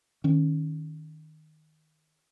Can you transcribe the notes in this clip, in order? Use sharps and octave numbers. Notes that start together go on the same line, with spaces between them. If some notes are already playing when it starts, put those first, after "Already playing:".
D#3 C#4